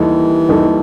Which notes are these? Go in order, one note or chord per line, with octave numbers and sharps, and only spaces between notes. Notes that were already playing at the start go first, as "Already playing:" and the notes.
Already playing: D#2 D#3 E3 G3 D#4 A4
D#2 D#3 G3 D#4 A4